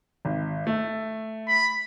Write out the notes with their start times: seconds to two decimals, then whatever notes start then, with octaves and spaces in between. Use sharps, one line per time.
0.25 G#1
0.67 A3
1.48 B5